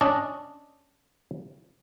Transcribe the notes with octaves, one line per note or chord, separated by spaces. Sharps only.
C#4 D4 D5 D#5